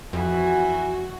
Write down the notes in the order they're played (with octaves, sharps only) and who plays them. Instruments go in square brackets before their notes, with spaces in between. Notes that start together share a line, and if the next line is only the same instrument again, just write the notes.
[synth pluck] F2 [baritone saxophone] E3 [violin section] F#4